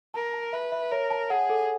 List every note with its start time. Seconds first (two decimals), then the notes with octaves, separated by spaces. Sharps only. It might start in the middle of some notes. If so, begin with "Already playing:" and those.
0.14 A#4 A5
0.33 A5
0.53 B4 E5
0.72 E5
0.91 A#4 C#5
1.10 A5
1.30 G#4 F#5
1.50 A4